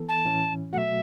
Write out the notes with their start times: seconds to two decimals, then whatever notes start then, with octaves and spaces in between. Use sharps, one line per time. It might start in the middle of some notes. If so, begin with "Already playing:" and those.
Already playing: E3 B3 A4
0.09 A5
0.25 A2 E3 C#4
0.73 B2 F#3 A3 F#4 E5 F#5